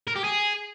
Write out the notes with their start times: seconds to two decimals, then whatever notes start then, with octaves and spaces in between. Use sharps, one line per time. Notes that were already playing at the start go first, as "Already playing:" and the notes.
0.07 A#4
0.16 G4
0.24 G#4